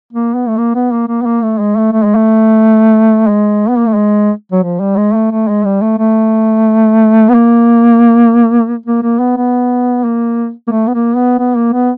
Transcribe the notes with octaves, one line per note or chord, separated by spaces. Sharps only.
A#3
B3
A3
A#3
B3
A#3
A#3
B3
A#3
A3
G#3
A3
A3
G#3
A3
G#3
B3
A#3
A3
G#3
F#3
F3
G3
G#3
A3
A3
G#3
G3
A3
A3
B3
A#3
A#3
A#3
B3
B3
A#3
A#3
A3
B3
A#3
B3
B3
A#3
B3